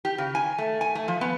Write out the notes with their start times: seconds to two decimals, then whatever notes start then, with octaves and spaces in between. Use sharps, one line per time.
0.05 G4
0.18 C#3
0.35 G#5
0.58 A3
0.81 G#5
0.95 A3
1.08 F3
1.21 B3